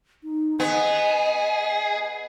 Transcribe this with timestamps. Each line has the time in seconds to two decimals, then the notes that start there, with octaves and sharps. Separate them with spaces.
0.23 D#4
0.60 B3 G#4 D#5